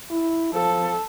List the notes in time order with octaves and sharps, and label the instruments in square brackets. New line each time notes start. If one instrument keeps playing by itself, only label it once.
[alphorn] E4
[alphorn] F3 [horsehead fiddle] A4